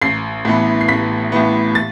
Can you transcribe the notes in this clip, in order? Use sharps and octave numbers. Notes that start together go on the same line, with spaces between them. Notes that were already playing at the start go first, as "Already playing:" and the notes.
A1 C7
A2 E3 B3
C7
A1 B6
A2 E3 B3
A6